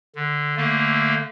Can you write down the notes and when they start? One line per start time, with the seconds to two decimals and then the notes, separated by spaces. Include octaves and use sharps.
0.16 D3
0.57 D3 A3 A#3